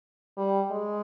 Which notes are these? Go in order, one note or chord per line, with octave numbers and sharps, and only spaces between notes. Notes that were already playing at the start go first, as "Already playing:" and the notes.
G3
G#3